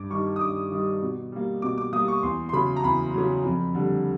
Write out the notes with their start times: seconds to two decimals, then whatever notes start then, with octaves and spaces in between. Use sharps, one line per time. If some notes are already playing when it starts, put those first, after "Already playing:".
Already playing: G2 D6
0.10 D#3 G3 C#6
0.36 D#6
0.41 G2 D6
0.71 D#3 G3
1.02 B2
1.32 G3 A#3
1.62 B2 D6
1.78 D6
1.93 G3 A#3 D#6
2.08 C#6
2.23 E2 C6
2.49 C6
2.53 C#3 F#3 B5
2.76 A#5
2.83 E2 B5
3.14 C#3 F#3
3.44 F2
3.74 D3 G3